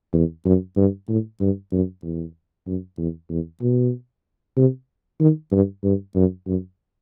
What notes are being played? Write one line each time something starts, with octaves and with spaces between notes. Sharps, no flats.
E2
F#2
G2
A2
G2
F#2
E2
F#2
E2
E2
B2
C3
D#3
G2
G2
F#2
F#2